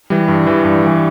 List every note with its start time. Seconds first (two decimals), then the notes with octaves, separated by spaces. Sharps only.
0.10 E3 G3
0.28 G2
0.47 E3 G3
0.65 G2
0.83 E3 G3